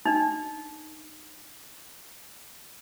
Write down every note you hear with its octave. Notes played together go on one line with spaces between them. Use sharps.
D4 D#4